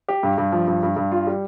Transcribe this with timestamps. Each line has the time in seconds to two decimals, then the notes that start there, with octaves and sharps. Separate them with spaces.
0.09 G4
0.23 G2
0.38 G2
0.52 F3
0.68 G2
0.83 G2
0.96 G2
1.12 F4
1.27 G3